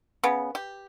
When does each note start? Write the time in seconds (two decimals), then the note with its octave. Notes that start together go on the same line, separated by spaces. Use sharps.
0.24 C#3 B3
0.55 G4